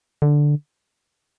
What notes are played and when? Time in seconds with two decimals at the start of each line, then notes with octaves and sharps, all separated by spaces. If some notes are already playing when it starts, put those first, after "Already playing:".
0.22 D3